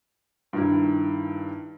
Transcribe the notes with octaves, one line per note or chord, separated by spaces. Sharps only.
G2 D#3 E4